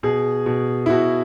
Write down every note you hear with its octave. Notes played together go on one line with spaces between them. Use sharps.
B2 G#4
B2
E4
B2 F#4